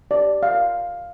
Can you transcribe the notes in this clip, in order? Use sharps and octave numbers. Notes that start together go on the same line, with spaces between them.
D5
F5